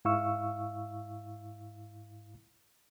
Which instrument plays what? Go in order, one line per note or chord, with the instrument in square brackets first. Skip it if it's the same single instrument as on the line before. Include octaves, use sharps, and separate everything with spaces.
[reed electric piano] G#2 E4 F5 C#6 E6